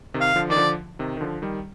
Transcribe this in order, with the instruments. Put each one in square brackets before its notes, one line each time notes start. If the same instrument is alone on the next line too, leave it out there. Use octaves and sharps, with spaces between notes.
[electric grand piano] C3 D#3
[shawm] F5
[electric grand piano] D3 F3
[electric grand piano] D#3 [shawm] D5
[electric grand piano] D3 F3
C3 D#3
D#3
D3 F3
D#3 G3